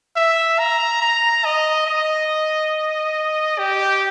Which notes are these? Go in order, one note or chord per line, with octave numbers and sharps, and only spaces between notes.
E5
A#5
A#5
D#5
D#5
G4